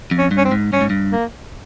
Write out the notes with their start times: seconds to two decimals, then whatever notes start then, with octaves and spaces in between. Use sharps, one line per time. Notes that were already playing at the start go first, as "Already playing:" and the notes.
0.11 F2
0.18 C#4
0.31 G2
0.37 C#4
0.45 C4
0.51 G#2
0.73 G2 C#4
0.81 G#2
0.90 G2
1.12 A#3